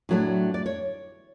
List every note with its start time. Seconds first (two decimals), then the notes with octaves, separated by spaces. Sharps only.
0.09 A2 F#3 A3 D4
0.54 D5
0.66 C#5